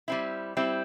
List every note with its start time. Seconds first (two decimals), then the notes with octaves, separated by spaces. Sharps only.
0.08 G3 C4 E4
0.57 G3 C4 E4